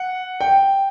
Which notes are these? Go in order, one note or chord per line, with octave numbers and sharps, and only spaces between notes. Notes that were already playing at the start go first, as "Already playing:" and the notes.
Already playing: F#5
G5